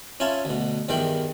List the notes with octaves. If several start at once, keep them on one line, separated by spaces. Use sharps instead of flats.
C#4 E4 F4 G#5 A5
D2 B2
E2 G2 D#3 E3 G5 B5